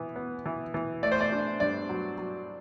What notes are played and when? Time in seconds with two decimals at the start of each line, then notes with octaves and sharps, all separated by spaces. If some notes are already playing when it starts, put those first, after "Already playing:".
Already playing: E3 B3
0.16 B3
0.46 E3
0.74 E3
1.03 A3 D5
1.12 C5
1.21 D5
1.32 D4
1.60 G2 D5
1.89 F#3
2.18 F#3